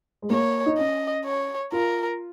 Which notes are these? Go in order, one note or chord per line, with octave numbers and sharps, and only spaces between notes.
G#3
A#3 C#5
D#4
C#4 D#5
C#5
F4 A#4